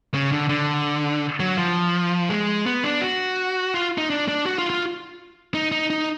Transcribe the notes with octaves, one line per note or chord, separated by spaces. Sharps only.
C#3
D3
D3
F#3
F3
G#3
B3
D4
F#4
F4
D#4
D4
D4
F#4
F4
F4
D#4
D#4
D#4